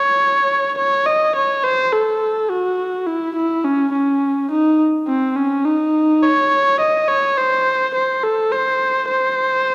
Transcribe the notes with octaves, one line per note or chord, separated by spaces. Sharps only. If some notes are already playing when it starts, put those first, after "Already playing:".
Already playing: C#5
C#5
D#5
C#5
C5
A4
F#4
E4
E4
C#4
C#4
D#4
C4
C#4
D#4
C#5
D#5
C#5
C5
C5
A4
C5
C5